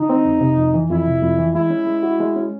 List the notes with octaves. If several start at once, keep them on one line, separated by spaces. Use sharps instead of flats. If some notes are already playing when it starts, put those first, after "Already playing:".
Already playing: D3 D#4
C4
F2
C3
F2
E3
F2 E4
C3
F2
E3
G#3 E4
C#4
G#3
F#4
G#3
C#4